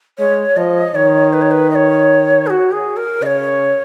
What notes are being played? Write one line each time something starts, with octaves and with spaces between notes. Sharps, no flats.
G#3 C#5
F3 D#5
D#3 C#5
B4
C#5
B4
D#5
C#5
G#4
F#4
G#4
A#4
C#3 C#5 D#5